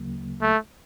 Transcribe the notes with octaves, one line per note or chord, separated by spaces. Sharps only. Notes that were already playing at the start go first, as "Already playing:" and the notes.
Already playing: D2 C#3 F#3 A#3
A3